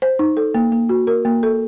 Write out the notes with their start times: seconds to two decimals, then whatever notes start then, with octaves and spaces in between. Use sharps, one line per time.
0.02 C5
0.19 D#4
0.37 A4
0.54 A#3
0.72 A#3
0.89 F#4
1.07 A#4
1.25 A#3
1.43 A4